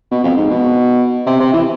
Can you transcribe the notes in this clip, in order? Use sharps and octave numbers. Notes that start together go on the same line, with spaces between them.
B2
F2
G#2
B2
C3
C3
E3